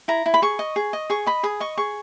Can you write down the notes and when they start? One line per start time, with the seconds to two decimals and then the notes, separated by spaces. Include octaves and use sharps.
0.08 E4 A#5
0.26 E4
0.34 B5
0.42 G#4 C#6
0.59 D#5
0.76 G#4
0.93 D#5
1.10 G#4 C#6
1.26 D#5 B5
1.43 G#4 D#6
1.60 D#5 C#6
1.77 G#4 C#6